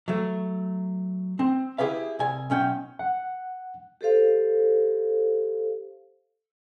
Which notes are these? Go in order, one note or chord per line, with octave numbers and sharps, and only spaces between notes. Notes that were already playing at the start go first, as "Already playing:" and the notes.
F#3 A3
C4
E4 G4 G#4 B4 F5
C2 G#5
B1 C#4 G5
F#5
G4 A4 C5 F5